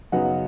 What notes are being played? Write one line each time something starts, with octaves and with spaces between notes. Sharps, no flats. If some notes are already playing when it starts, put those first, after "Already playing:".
F#2 C#3 F#3 B3 D#4 F#5